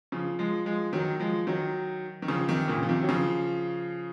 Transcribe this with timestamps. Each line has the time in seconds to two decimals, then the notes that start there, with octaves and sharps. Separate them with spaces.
0.12 C#3 F3
0.39 F3 G#3
0.66 F3 G#3
0.93 D#3 F#3
1.20 F3 G#3
1.47 D#3 F#3
2.22 D#3
2.28 C#3 F3
2.48 C3 D#3
2.68 A#2 C#3
2.83 F3
2.89 C3 D#3
3.03 F#3
3.09 C#3 F3